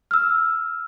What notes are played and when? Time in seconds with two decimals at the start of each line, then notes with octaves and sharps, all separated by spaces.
0.11 E6 F6